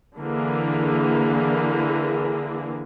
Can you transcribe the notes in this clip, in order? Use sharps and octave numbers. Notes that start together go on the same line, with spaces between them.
D3 E3 A#3 G#4